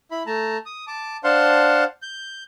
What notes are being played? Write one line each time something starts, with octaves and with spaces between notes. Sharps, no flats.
E4 B5
A3 A5 A#5
D#6
A5 D6
D4 C5 F5 F#5 A5 C6
G6